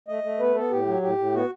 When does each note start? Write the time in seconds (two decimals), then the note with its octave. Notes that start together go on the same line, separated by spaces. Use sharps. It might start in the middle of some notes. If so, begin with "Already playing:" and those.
0.08 A3 D#5
0.23 A3
0.39 B3 B4
0.55 B3 A4
0.71 A2 G4
0.86 F#3
1.02 A2 G4
1.18 A2
1.34 B3 F#4